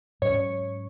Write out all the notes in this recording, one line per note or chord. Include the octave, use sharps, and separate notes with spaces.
G#2 F#3 C#4 C#5